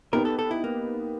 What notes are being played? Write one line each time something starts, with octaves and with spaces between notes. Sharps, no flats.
B3 D#4 G4 A#4 B4
A4
A4
E4
A#3